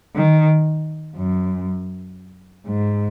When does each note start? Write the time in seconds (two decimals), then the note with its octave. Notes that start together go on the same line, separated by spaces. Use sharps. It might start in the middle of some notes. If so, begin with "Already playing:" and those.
0.15 D#3
1.16 F#2
2.67 G#2